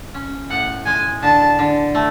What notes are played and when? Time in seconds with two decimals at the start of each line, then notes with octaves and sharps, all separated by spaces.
0.14 C#4
0.50 A2 F#5
0.86 G#3 G#5
1.22 D3 A5
1.59 D3
1.95 A3